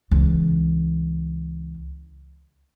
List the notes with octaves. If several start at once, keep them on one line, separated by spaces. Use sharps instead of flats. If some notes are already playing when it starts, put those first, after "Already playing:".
C#2 E3